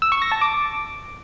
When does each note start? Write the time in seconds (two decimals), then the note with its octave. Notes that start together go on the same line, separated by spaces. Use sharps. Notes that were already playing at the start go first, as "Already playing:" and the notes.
0.02 E6
0.12 C#6
0.22 A#6
0.32 A5
0.41 D6